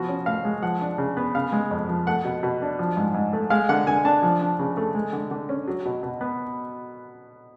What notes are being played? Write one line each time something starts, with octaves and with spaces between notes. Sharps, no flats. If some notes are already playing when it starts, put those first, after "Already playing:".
Already playing: F3 B3 F#4
C#4
A2 F5
G#3
F3 F#5
D4
C#3
B3
C#3 F5
G#3
F2
F3
A3 F#5
B2
B2
D4
F3
G#2
G#2
A3
G#3 F5
D3 F#5
D3 G#5
D4 A5
F3
D4
C#3
A3
G#3
D3
D3
C#4
F#3
B2
B2
B3